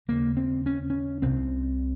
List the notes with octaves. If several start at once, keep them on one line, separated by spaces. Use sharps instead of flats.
D#2 C#3 A#3
C4
C#4
C#4
C2 C3 C4